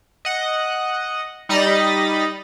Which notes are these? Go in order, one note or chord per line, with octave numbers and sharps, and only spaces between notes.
D#5 F#5
G3 D#4 D#5 A#5 B5 A6